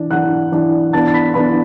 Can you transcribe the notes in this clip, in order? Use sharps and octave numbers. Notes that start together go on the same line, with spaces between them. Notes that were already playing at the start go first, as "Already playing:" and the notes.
Already playing: E3 D4
E3 D4 F#5 F#6
E3 D4
E3 B3 D4 A5 A6
A6
B5 B6
E3 B3 D4 B4 B5